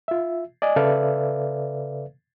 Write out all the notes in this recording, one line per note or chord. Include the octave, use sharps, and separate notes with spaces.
F4 E5
D5 D#5 G#5
C#3 A4 B4 D5 E5 F5